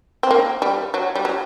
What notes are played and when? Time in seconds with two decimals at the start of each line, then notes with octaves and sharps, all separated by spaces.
0.23 C4
0.31 A#3
0.62 G3
0.94 F#3
1.15 G3
1.25 F#3